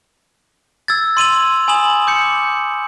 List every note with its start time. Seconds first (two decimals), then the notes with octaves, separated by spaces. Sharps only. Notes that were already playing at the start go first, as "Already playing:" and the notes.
0.88 E6 G#6 A6
1.17 C6 D#7 F7 F#7
1.68 G#5 B5 D#6 E7 F#7
2.07 D6 G6 C#7